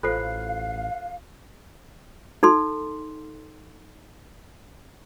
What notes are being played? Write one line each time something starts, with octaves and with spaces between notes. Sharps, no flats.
A1 F4 A4 C5 F5 F#6 C7
D#4 A4 C6